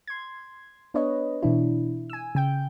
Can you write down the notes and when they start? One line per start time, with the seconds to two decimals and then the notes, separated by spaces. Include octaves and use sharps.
0.08 C6 G#6
0.94 B3 D4 B4 C#5 D#5
1.42 B2 E3 D4 E4
2.10 G#5 E6
2.35 C#3 G5 G6